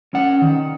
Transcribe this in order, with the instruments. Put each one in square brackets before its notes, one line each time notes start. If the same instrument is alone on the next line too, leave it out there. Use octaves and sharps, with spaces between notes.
[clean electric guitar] C#4 F#5
D#3